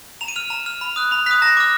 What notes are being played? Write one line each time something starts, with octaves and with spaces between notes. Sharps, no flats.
A#5 F7
D#7
F6 F7
A#5
F6
B5
D#6 F#6
B5 F7
D#6 F#6 B6
A#5 A#6
D6 F6